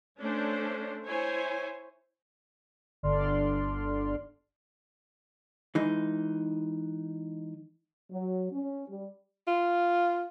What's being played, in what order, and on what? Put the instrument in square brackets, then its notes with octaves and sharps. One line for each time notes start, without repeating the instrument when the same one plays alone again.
[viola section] A3 C#4 D4 C5
E4 C5 C#5 G#5
[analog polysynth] G1 D3 D4 D5 C6 F6
[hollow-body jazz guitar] E3 G#3 D#4
[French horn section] F#3
C#4
G3
[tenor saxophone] F4